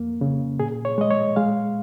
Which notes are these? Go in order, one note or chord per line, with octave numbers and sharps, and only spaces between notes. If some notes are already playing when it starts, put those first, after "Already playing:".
Already playing: F2 A#3
C#3
A#2 G#4
C#5
G#3 D#5
C#5
G#3 F5